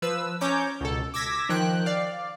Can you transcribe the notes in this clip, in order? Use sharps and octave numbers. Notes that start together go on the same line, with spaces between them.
F3 B4 E6
C#4 C#5 A#5 D6 G6
C#2 B2 A4
D6 E6 G#6 A#6 B6
D#3 F3 G5 F#6
D5 F5